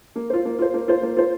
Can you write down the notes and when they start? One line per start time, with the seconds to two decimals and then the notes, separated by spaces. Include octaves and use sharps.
0.16 A#3
0.30 F4 C5
0.45 A#3
0.59 F4 C5
0.74 A#3
0.88 F4 C5
1.02 A#3
1.16 F4 C5